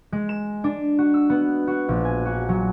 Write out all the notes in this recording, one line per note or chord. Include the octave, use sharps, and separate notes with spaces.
G#3
E7
D4
F#4
E6
B3
F#4
A#1
G#5
F#4
F#3